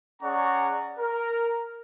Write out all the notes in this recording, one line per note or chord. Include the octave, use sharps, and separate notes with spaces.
C#4 G#4 D5 F#5 A#5 C#6
A#4